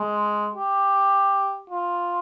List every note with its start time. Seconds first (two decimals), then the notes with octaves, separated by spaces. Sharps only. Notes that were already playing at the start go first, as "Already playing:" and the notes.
Already playing: G#3
0.55 G4
1.70 F4